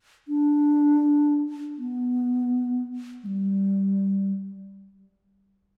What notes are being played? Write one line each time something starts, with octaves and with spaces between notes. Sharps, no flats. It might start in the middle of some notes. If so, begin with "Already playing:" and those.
D4
B3
G#3
G3